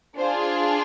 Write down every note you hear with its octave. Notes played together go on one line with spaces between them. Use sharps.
D4 F4 G#4 C5